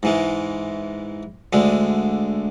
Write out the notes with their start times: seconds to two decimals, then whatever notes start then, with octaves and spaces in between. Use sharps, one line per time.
0.03 G#2 E3 G#3
1.53 D2 D3 G#3